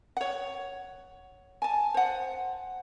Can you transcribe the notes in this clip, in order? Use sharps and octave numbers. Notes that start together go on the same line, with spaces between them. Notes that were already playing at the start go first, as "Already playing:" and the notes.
C#5 F#5
G#5 A5
C5 F#5